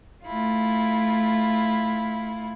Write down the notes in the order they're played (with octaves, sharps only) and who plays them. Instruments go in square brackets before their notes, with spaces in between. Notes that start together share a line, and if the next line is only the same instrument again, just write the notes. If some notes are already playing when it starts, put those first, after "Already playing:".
[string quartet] A3 E4 F4